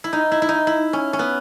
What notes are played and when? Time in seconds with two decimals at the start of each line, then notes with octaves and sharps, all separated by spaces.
0.04 E4
0.13 D#4
0.32 E4
0.42 E4
0.49 D#4
0.67 E4
0.93 C#4
1.13 C#4
1.19 B3